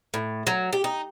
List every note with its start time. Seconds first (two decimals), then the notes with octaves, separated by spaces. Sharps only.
0.14 A2
0.47 F#3
0.73 G4
0.84 D#4